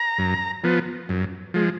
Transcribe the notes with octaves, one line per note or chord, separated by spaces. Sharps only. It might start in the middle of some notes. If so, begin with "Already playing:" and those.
Already playing: A#5
F#2
F3 B3
F#2
F3 G#3